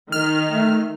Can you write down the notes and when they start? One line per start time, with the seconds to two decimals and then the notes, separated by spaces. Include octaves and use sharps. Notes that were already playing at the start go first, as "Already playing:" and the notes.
0.12 D#3 F6
0.51 A3